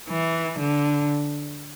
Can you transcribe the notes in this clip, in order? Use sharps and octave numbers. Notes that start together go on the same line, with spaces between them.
E3
D3